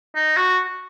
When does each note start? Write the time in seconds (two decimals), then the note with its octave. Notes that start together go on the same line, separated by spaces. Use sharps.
0.15 D#4
0.36 F#4